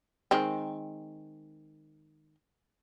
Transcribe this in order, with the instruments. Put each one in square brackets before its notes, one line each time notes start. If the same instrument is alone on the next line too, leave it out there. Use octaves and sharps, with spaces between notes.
[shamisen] D#3 G#3 C4